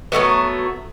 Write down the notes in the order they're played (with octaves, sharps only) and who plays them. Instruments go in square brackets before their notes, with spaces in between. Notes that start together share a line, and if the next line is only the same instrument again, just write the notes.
[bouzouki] F#3 G3 A3 B3